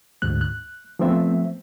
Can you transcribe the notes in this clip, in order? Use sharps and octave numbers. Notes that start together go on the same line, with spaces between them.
D2 G#2 F#6
F#6
F3 A3 B3 C4 E5